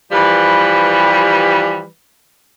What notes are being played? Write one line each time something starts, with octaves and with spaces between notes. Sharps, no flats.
E3 F3 G3 G4 B4